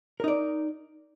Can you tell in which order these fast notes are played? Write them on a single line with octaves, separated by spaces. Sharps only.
A#4 D#4 D5